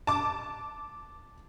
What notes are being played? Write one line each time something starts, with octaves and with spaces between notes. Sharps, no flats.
A5 D6